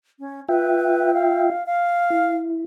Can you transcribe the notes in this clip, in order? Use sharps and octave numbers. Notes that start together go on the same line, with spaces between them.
C#4
F4 B4 E5 G5
F5
F5
E4